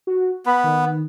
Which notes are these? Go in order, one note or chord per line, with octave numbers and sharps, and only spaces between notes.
F#4
B3 B5
D#3